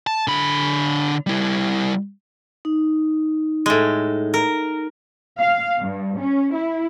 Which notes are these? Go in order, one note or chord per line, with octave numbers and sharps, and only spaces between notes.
A5
D3 B5
G3 E4
D#4
A2 G#3
A#4
F5
G2
C#4
E4